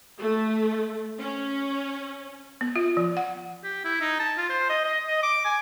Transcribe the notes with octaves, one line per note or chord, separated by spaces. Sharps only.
A3
C#4
B3
F4
F3
F#5
G4
E4
D#4
A5
F4
C5
D#5
D#5
D#5
D6
G#5